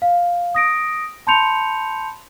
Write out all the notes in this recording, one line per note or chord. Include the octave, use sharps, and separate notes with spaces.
F5
D#6 A#6 D7
A5 B5 C6 G6 C#7 F7